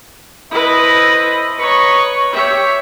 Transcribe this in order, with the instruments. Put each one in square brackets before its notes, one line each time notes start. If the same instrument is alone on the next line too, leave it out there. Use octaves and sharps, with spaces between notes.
[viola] E4 B4 [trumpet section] A4 C5 D#5
[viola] B4 C#5 [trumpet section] D#5 A#5 C#6
[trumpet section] G4 [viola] C#5 E5